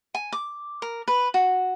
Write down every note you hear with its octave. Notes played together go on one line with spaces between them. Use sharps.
G#5
D6
A#4
B4
F#4